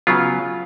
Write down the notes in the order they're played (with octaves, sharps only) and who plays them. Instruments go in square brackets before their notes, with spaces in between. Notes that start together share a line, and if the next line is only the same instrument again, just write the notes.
[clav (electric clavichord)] C#3 F#3 B3 F4